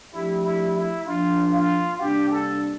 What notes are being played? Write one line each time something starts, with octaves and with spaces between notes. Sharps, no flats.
F3 A3 D4 E4 G4
E4
E4
F3 A#3 D4 F4
F4
C3 G3 A#3 D4 G4
A4